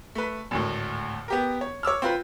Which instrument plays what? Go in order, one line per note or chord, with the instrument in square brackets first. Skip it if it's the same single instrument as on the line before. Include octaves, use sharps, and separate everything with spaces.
[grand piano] A3 B4
G#1 D2 A2
B3 G4 A#4
C#5
C#5 D6 E6 F6
C4 F4 B4